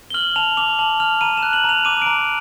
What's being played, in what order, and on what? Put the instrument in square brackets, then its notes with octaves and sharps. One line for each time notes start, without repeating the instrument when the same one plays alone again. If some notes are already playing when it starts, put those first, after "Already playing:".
[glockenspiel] G7
F6 F#7
A5 F7
D6 F7
A5 F#7
F6 F7
A#5 D#7
E7
F#6
F#7
A#5 F7
D6 D#7
A#5 D7